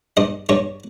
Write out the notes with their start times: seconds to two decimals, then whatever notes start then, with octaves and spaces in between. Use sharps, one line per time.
0.17 G2 D#5
0.49 G2 C#5